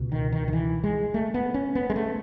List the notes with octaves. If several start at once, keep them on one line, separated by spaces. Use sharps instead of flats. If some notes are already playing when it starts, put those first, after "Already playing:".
Already playing: C#2 B2
D#3
D#3
D#3
E3
G#3
A3
B3
C#4
B3
G#3
A3